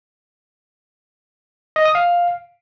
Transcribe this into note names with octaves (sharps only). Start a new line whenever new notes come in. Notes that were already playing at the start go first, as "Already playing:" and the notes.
D#5
D#6
F5